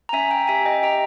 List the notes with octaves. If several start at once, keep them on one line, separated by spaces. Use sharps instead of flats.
A#5
C#4 E5 G#5
G5 A#5
G4 E5 G#5
D#5 G5
G4 G5 A#5